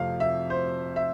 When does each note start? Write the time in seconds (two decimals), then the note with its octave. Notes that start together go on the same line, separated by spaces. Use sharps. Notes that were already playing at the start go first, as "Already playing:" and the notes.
Already playing: F2 C3 F3 A3 C4 F5
0.20 E5
0.50 C5
0.96 E5